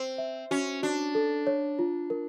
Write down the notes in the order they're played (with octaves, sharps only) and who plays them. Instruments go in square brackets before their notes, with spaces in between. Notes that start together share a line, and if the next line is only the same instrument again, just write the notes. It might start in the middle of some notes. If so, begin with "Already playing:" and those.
Already playing: [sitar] C4 [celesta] C5
[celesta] E5
[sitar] C#4 [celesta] F#4
[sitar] D4 [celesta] F#4
[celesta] A4
C#5
F4
A#4